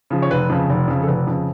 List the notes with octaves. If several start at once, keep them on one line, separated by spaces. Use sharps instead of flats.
C#3 F3
C#5
F1 B4
F2 C#3
F1
F2 C#3
A4
F1 B4
F2 C#3